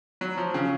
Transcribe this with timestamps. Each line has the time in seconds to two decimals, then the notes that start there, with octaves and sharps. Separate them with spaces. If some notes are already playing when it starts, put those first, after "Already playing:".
0.21 F#3
0.38 F3
0.54 C#3